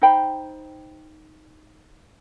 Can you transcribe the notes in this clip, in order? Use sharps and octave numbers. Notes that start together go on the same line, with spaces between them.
D#4 C5 G5 B5